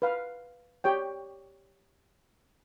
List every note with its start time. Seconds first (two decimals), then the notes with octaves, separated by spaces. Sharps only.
0.02 B4 F5
0.84 G4 C#5 G5